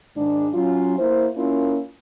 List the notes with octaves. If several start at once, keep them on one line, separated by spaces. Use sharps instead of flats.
G#2 D#3 G#3 D4
F#3 C#4 F4
A#3 E4 C5
A#3 C#4 E4 F4 A#4